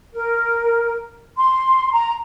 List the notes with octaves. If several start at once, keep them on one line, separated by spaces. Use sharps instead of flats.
A#4
C6
A#5